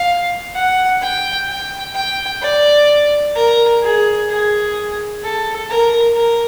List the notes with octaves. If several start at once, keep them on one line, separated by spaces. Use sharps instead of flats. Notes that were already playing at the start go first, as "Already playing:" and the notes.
Already playing: F5
F#5
G5
G5
G5
D5
A#4
G#4
G#4
A4
A#4
A#4